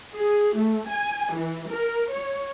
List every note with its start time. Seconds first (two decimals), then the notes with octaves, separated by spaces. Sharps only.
0.14 G#4
0.57 A3
0.89 G#5
1.32 E3
1.71 A#4
2.12 C#5